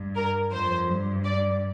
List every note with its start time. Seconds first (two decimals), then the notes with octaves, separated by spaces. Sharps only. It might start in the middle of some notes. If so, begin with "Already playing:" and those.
Already playing: G2
0.16 A#4
0.52 F2 C5
0.89 G2
1.24 D5